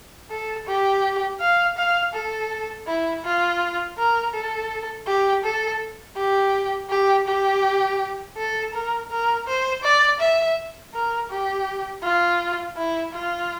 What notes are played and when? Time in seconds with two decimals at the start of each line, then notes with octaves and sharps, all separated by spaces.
0.31 A4
0.67 G4
1.40 F5
1.77 F5
2.14 A4
2.87 E4
3.24 F4
3.98 A#4
4.34 A4
5.07 G4
5.44 A4
6.17 G4
6.90 G4
7.27 G4
8.37 A4
8.73 A#4
9.11 A#4
9.47 C5
9.83 D5
10.19 E5
10.94 A#4
11.30 G4
12.03 F4
12.77 E4
13.13 F4